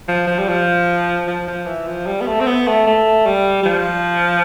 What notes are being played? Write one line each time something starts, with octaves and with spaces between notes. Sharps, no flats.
F3
F3
G3
F3
F3
F3
E3
F3
G3
B3
A3
C4
B3
A3
A3
G3
G3
F3